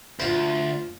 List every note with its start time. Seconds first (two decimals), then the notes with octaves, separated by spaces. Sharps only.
0.20 D2 F4 C5